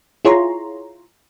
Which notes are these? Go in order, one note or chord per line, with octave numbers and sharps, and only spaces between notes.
E4 F4 G#4 C#5 A#5 C6